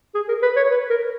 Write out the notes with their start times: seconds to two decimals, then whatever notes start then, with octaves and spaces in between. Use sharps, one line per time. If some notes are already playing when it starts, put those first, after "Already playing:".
0.14 G#4
0.28 A#4
0.42 B4
0.56 C#5
0.71 B4
0.90 A#4